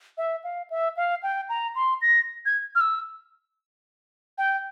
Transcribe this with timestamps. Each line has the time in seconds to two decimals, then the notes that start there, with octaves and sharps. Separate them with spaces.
0.18 E5
0.44 F5
0.70 E5
0.97 F5
1.23 G5
1.49 A#5
1.76 C6
2.02 A#6
2.46 G#6
2.75 F6
2.81 E6
4.38 G5